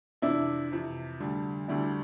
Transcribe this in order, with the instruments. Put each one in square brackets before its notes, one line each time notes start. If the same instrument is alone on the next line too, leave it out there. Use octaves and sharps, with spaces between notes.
[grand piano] F2 C3 E3 [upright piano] D4 E4
[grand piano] F2 C3 E3
D2 D3 G3
[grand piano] D2 D3 G3 [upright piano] D4 E4